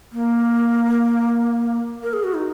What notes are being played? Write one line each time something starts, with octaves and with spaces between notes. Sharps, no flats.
A#3
A#4
G#4
F#4
D#4